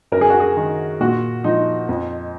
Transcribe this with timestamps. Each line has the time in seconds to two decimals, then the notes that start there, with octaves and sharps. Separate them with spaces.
0.12 F#2 A#4
0.21 G#4
0.30 F#4
0.40 G#4
0.57 D#3
1.00 A#2 F#4
1.44 F3 D#4
1.89 F2